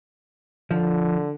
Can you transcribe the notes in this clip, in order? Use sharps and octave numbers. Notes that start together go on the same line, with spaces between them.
D3 F3